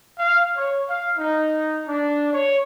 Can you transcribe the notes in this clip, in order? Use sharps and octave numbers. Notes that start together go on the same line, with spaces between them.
F5
C#5
F5
D#4
D4
C#5